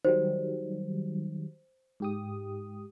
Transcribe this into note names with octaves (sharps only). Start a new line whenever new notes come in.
D#3 F#3 G3 C5
G#2 G4 D#6